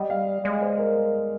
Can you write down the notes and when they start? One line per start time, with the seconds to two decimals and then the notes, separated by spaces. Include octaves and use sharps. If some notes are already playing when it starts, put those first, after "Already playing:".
Already playing: G3 D#5
0.10 F5
0.44 G#3 D5
0.61 C5
0.79 A#4